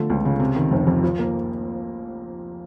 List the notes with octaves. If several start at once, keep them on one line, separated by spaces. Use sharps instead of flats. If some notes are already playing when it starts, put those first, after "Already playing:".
Already playing: D3 F3 A3
C#2
C#3
C3
D#3
F1
F2
F3
A#3